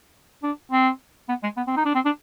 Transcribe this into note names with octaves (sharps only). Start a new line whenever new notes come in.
D4
C4
B3
G#3
B3
C4
D#4
D4
C4
D4